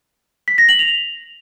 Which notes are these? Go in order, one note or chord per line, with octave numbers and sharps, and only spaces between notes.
B6
A#6
F#7
F7